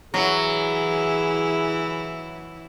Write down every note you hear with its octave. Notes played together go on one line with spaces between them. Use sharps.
E3 F#3 E4 G#4